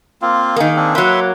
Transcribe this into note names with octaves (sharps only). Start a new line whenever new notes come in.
A#3 C4 F4
D#3 A#3 G#4
C4 D4 G#4
F#3 A#3 B4 E5 C6